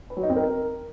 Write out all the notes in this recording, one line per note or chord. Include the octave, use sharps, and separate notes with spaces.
B4
F#3
D#4
C4
A#4